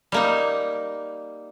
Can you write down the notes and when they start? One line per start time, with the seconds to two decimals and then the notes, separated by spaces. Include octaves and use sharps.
0.12 G3 A#3 D#4